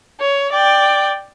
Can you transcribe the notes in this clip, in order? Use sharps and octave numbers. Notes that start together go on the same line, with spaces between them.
C#5
D5 G5